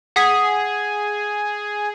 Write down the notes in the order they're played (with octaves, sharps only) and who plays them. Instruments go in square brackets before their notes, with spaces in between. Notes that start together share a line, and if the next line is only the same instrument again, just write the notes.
[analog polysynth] G#4 [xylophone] F#5 D#6 B6